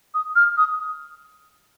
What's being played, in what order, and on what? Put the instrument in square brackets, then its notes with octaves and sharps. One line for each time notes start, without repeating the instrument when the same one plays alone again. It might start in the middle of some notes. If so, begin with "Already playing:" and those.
[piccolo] D#6
F6
D#6